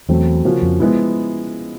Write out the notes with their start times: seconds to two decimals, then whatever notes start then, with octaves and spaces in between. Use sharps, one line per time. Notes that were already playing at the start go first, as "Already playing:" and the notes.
0.09 E2 F#3 A3 C4
0.45 C#3 F3 A#3 C#4 F#4
0.62 F2
0.80 F3 G#3 B3 E4